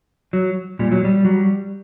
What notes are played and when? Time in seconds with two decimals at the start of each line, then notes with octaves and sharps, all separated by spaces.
0.33 F#3
0.79 A#2 G3
0.92 F#3
1.05 G3
1.25 F#3